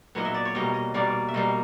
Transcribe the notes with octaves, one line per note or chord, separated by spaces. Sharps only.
A#2 F#3 B3 D#5
E5
D5
C#5
B2 G3 A#3 D#5
D#5
B2 G3 A#3 D5
E5
B2 G3 A#3 D#5